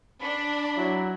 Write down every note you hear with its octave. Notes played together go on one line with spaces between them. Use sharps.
D4 B5
F#3 E4